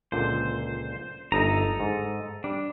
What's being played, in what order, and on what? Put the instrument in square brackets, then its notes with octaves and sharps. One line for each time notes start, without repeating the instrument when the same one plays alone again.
[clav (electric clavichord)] C#2 A#2 D3 [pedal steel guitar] C5
[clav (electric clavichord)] G1 D#4 G#5 [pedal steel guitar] A4 D#5 A#5
[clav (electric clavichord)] G#2
[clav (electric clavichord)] G3 [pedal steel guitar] D4